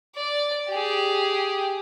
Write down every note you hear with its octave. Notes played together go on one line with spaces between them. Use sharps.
D5
G4 G#4